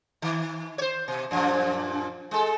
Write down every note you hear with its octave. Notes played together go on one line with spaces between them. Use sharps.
D#3
C5 C#5
B2
F#2 A#2 F3
G#3 A4